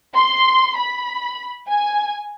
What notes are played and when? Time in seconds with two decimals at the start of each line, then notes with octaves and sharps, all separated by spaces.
0.15 C6
0.76 B5
1.69 G#5